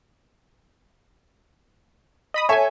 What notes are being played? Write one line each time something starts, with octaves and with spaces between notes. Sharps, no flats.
D#5 B5 D#6
A4 C#5 E5 G#5